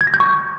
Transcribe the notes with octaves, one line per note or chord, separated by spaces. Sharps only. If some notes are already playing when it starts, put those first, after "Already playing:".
G#6
A#6
G6
C#6